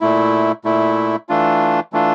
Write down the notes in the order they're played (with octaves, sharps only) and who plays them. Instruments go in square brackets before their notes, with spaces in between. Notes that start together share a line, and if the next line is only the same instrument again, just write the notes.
[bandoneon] A#2 A3 E4
A#2 A3 E4
E3 A3 D4 F4
E3 A3 D4 F4